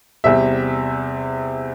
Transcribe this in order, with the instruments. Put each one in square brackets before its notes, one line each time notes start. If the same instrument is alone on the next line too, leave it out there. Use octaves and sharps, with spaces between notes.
[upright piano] E2 C3 G3 E5